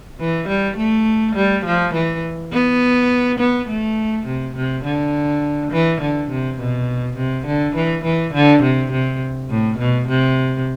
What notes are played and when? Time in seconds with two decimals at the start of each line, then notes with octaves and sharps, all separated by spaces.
0.19 E3
0.48 G3
0.77 A3
1.35 G3
1.65 F3
1.93 E3
2.52 B3
3.39 B3
3.68 A3
4.26 C3
4.55 C3
4.84 D3
5.72 E3
6.01 D3
6.30 C3
6.59 B2
7.17 C3
7.46 D3
7.75 E3
8.04 E3
8.33 D3
8.63 C3
8.92 C3
9.50 A2
9.79 B2
10.08 C3